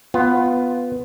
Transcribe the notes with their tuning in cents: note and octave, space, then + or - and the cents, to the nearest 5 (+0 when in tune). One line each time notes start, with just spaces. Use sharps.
B3 +10 F4 +0